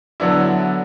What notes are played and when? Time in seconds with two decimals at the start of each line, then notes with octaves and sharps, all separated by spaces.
0.20 D3 F#3 B3 D4 E4